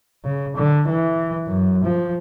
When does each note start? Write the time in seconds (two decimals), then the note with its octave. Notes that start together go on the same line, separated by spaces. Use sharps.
0.25 C#3
0.56 D3
0.89 E3
1.47 F#2
1.84 F3